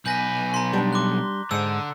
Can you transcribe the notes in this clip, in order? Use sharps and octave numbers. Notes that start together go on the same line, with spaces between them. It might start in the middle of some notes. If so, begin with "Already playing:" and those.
B1 B4 G#5 G6 A#6 B6
A#5 C6
G3 D4 A5
C6 D6 F#6
G#2 D3 C5 E6 C#7